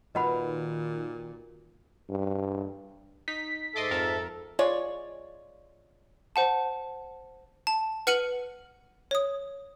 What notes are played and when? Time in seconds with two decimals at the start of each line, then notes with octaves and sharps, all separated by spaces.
0.15 A#2 D#3 F#4 B4 D#5 F#5 B5
2.09 G2
3.28 D#4 B6
3.76 G#2 A4 D#5 E5 C6 D6
3.91 F2 A#4 A5
4.59 G#3 F4 C#5 D5
6.36 C5 F#5 A5
7.67 A5
8.07 B4 F#5 F6 C#7 D#7 F#7
9.11 C#5 D#6